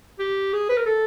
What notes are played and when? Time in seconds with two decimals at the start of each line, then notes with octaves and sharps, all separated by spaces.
0.19 G4
0.53 G#4
0.69 B4
0.77 A#4
0.86 A4